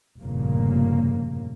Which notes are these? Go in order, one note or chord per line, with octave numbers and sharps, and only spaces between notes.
F1 G2 A#2 C#3 A#3